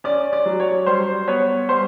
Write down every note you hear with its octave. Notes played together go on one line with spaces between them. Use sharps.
C#4 D5
D5
F#3
C#5
G3 C5
B3 C#5
G3 C5